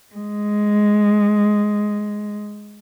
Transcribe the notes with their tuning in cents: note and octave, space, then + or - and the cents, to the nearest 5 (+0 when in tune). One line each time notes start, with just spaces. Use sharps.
G#3 +5